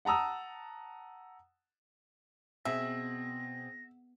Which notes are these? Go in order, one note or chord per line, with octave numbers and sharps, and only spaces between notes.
F#5 A5 A#5 D#6 E6
B2 C4 G#4 E5 A#6